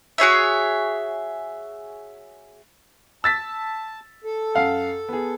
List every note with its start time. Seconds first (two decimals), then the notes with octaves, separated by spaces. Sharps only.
0.18 F#4 G#4 C#5 E5
3.24 A5 E6 A6 B6
4.24 A4
4.55 F#2 F5 F#5
5.09 B3 G#4